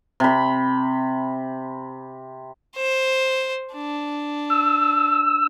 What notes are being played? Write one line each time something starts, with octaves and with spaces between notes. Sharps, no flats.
C3 B5
C5
D4
E6